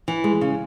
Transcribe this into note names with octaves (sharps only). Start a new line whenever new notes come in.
E3
G#3
C#3